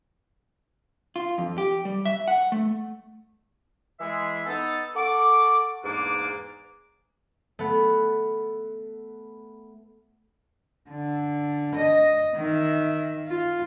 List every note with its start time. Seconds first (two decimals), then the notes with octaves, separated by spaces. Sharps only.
1.16 F4
1.38 F2
1.58 G4
1.85 G3
2.05 E5
2.28 F#5
2.52 A3
4.00 E3 G#3 E5
4.46 B3 D#4 A4
4.96 A4 F#5 C#6 D6
5.83 E2 G#2 G#3 A#3 D4 D6
7.59 A3 B3
10.90 D3
11.75 D#5
12.35 D#3 E5
13.28 F4